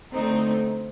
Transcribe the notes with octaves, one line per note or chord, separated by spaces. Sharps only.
D3 A3 C4 D#4